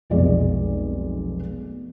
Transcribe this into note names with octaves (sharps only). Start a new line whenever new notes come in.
F1 B1 G#3 D5